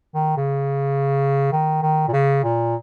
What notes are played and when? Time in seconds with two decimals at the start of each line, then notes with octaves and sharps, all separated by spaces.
0.15 D#3
0.37 C#3
1.52 D#3
1.82 D#3
2.08 A#2
2.13 C#3
2.43 A#2